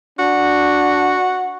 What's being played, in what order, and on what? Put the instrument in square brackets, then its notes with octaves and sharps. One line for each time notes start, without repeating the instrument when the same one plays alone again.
[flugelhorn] D4 [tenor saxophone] F#4